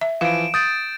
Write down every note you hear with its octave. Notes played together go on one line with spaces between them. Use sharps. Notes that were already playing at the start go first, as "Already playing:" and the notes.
E5
E3 F3 F5 D7 E7
D#6 G6 A6 D7